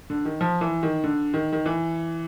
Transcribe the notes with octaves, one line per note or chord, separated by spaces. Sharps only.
D3
D#3
F3
E3
D#3
D3
D#3
D#3
E3